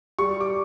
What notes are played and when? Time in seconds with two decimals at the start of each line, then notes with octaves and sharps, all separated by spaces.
0.19 G3 C#6
0.40 D6